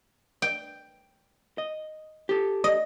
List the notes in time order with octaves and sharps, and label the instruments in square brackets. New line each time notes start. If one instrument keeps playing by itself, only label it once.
[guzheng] G5
[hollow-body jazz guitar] D#5
G4 A4
[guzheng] D#5